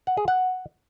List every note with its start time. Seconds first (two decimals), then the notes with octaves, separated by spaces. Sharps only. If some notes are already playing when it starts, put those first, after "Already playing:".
0.07 F#5
0.17 G#4
0.28 F#5